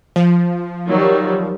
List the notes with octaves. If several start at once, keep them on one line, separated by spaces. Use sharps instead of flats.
F3
D#3 F#3 G3